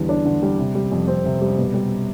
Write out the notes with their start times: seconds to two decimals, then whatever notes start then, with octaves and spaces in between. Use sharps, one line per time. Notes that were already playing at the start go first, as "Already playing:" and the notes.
Already playing: E2 D3 G3
0.09 D4
0.25 D3
0.43 G3
0.58 C3
0.75 G3
0.92 F2
1.08 C4
1.25 C3
1.41 G3
1.58 B2
1.74 G3